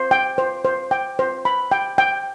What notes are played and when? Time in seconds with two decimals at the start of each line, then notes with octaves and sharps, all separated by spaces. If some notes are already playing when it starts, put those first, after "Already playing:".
Already playing: C5
0.11 G5
0.38 C5
0.65 C5
0.91 G5
1.19 C5
1.45 B5
1.72 G5
1.98 G5